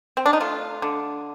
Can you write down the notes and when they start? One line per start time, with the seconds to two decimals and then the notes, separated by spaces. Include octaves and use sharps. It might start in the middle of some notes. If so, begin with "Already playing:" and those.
0.17 C4
0.26 D4
0.33 D#4
0.40 A3 F4
0.82 D3